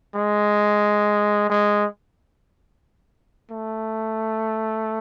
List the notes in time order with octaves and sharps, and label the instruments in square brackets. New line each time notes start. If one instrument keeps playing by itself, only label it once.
[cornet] G#3
G#3
A3